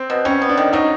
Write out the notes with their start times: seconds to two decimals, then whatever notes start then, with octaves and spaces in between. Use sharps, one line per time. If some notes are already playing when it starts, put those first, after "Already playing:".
Already playing: C4
0.10 B2
0.25 G3 C#4
0.42 B3
0.49 D4
0.57 D#3
0.73 F#3 D#4